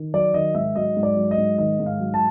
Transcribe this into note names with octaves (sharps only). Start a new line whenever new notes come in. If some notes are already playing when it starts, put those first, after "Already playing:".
Already playing: D#3
F#3 D5
D#3 D#5
G#2 E5
F#3 D#5
G#2
D5
F#3
D#5
G#2
D#3 D#5
G#2
F5
F#3
A5